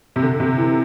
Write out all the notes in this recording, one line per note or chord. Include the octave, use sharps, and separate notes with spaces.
C3
D3
C3
E3